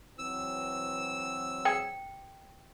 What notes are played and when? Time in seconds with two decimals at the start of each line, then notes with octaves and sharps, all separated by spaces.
0.19 E3 F#3 C4 E6
1.65 G#4 G5